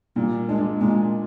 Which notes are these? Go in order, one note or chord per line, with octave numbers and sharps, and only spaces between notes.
A#2 G3
G#3 D4
A#2 G#3